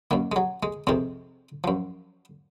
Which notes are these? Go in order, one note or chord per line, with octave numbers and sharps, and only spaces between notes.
F#2 D#3 A#3
G#3
F#3
G#3
F2 C3 D#3 G#3
F#2 F3